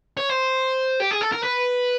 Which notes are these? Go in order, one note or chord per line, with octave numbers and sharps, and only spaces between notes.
C#5
C5
G4
G#4
A4
A#4
B4